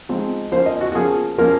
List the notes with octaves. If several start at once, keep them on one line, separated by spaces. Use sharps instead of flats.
F3 G#3 C4 D#4
F3 A#3 C#4 C5
D#5
F#4
F#4
F3 A#3 C#4 G#4
F3 A#3 C#4 A#4